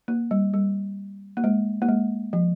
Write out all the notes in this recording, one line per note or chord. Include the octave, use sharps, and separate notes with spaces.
A#3
G3
G3
A#3
G#3
A#3
G#3
F3